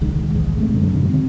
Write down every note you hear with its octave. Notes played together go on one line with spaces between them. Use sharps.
D#1 C2 D#3 G#3
G#1 E2 G#3
C3 A3
E1 F#2 D3 G#3
F#2 B2 D#3 F#3
D3 C4